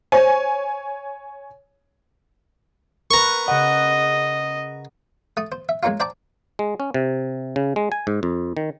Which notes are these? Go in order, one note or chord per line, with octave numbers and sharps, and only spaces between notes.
C5 C#5 G#5
A#4 B4 A#5 C#6
C#3 D#5 F#5
A3 D#6
C5
E5
G#3 A#3 C#4 D#4 F4
C5 D5 G5 A5 A#5 D6
G#3
C#4
C3
C#3
G#3
G#5
G#2
F2
D#3